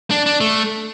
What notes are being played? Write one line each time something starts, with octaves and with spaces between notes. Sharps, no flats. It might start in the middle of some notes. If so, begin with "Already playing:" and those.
D4
D4
A3